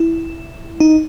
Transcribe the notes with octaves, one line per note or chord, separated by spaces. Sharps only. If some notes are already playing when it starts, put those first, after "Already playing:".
Already playing: E4
D#4